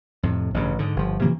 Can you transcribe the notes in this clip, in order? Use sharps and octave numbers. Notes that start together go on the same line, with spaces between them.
F2 A2 C3
A1 G2 C#3
G#2 D3
G1 F3
C3 E3 F3 A#3